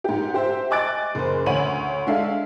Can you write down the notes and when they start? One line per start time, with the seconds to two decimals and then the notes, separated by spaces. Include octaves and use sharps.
0.04 G#2 G4
0.34 G4 C5 E5
0.71 D#5 G#5 D6 F#6 A6 D7
1.15 F#1 C5
1.46 D2 C#5 B5 D#7 F#7
2.07 G#3 D4 A4 E5 F5